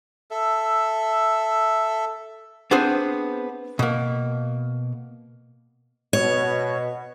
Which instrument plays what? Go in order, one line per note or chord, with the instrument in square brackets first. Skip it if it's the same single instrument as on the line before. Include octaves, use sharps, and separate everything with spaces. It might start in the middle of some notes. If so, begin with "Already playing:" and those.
[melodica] A4 E5
[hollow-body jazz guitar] B3 C4 D4 G#4 C5
B2 A#3
[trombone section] B2 [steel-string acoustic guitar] C#5